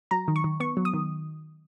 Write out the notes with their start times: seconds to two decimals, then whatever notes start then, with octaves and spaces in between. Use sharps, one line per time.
0.11 F#3 A#5
0.28 D#3
0.36 C#6
0.44 D#3
0.60 B3 C#6
0.77 F#3
0.85 D#6
0.94 D#3